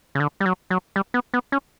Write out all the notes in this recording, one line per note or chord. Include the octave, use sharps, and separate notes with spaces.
C#3
D3
G3
F#3
F#3
G3
B3
B3
C#4